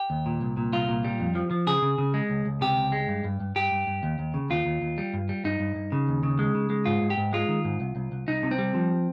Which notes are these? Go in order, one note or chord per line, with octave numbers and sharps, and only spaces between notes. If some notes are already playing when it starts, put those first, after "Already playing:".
Already playing: G4
D#2
A#2
C2
A#2
C2 F4
A#2
G3
F2
F3
F3
C#3 G#4
C#3
C#3
G#3
C#2
C#2
C3 G4
C#2
G#3
G2
G2
G2
G2 G4
G2
G2
D#2
D#2
C#3
D#2 F4
D#2
D#2
G3
G2
G3
G2 D#4
G2
G2
C#3
D#2
C#3
G#3
C#3
G#3
G#2 F4
G#2
G4
G#2
G#3 F4
D#3
G#2
C2
C2
C2
C2 D#4
C3
C4
G3
F3